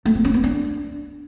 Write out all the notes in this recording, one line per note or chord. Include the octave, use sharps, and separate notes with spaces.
A3
C4
C#4
B3
D4